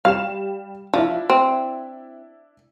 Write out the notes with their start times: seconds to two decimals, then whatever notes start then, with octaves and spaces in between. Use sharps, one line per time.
0.05 G3 F5 E7
0.94 F3 D4 E4
1.30 C4